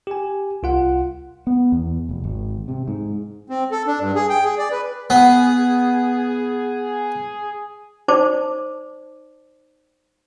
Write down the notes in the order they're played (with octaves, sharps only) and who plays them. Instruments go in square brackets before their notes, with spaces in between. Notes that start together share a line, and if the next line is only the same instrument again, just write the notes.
[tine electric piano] G4 G#5
C2 F4 F#5
[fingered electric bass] B3
E2
F1
G#1
C3
G#2
[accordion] C4
A4
D4
G2
G#4
G5
G#4
D5
B4
[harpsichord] B3 [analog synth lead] G#4
[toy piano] D#4 C5 D5 A5 D6